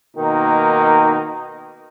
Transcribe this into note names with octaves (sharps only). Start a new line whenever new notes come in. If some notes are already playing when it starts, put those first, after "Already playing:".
B2 D#3 A#3 D#4